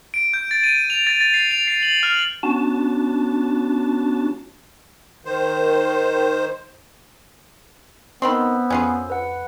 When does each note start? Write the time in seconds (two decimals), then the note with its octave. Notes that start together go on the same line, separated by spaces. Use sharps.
0.14 D7
0.34 G6
0.51 A6
0.64 D#7
0.90 F7
1.07 A6
1.21 A6
1.34 C7
1.51 F7
1.67 C7
1.83 F#7
2.03 F6
2.43 B3 C#4 D4 F#4 A5
5.25 D#3 C5
8.22 D#3 B3 C4 C5 B5 C6 E6
8.70 F2 C#4 F4 G#4
9.10 B4 F#5